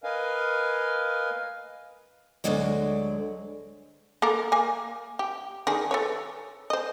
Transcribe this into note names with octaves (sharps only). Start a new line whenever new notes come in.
A#4 B4 D#5 F5 G#5
D2 D3 E3 F#3 G#3 D5
A#3 A4 A#4
A#3 G#5
G4
D#3 D4 G#4
A4 B4 C#5
C5 D#5